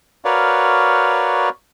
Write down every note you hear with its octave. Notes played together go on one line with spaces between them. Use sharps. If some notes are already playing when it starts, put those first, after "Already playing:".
F#4 A#4 B4 C#5 D5 F5